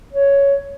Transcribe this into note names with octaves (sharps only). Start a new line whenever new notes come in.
C#5